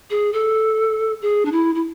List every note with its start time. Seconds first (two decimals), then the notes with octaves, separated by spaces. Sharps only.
0.10 G#4
0.33 A4
1.22 G#4
1.45 D4
1.52 E4
1.75 E4